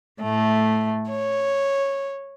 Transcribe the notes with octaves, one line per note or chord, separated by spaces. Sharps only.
A2 A3
C#5